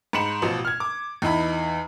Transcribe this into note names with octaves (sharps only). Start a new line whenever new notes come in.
G#2 B5 C#7 E7 F#7
A1 B2 F3
F6 G#6
D6
E2 D#4 E4 B5